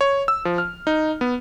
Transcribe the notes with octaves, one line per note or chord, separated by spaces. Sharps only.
C#5
E6
F3
F6
D#4
B3